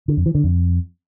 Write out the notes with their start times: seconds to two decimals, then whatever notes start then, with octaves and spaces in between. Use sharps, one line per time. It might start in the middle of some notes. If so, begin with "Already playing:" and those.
0.08 D3
0.17 F2
0.26 E3
0.35 D3
0.44 F2